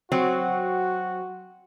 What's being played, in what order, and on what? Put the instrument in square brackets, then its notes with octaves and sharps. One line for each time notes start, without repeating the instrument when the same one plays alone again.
[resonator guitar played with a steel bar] F#3 C4 [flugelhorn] F#4